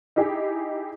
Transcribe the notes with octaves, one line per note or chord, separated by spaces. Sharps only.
D#4 E4 G4 G#4 G5